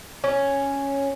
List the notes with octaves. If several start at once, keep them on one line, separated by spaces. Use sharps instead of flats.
C#4